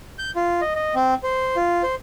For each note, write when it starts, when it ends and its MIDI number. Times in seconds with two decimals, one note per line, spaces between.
0.18 0.31 91
0.36 0.61 65
0.61 0.73 75
0.76 0.95 75
0.95 1.14 60
1.23 1.56 72
1.56 1.82 65
1.83 1.95 72